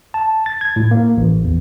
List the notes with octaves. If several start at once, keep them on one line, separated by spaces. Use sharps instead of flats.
A5
A6
G#6
A2
A#3
A1
E2